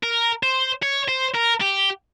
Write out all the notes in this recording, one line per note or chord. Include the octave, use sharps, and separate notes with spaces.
A#4
C5
C#5
C5
A#4
G4